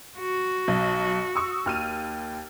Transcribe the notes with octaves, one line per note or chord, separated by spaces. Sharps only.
F#4
B1
C#6 D#6 E6
D#2 F6 D#7